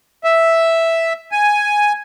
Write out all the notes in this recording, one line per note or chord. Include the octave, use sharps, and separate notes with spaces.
E5
G#5